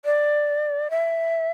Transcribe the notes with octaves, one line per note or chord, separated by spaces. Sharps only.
D5
E5